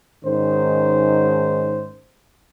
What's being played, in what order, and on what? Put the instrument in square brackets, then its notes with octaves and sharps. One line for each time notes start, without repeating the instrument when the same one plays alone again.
[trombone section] G#2 D#3 C#4 C5